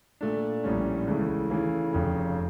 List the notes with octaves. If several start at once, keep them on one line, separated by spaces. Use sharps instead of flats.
A#2 A3 D4
A#1 A2 G3 C#4
C#2 C#3 E3 A3
C#3 E3 A3
F1 F2 C#3